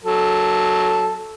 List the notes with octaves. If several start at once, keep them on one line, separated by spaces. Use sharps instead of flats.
F#3 A4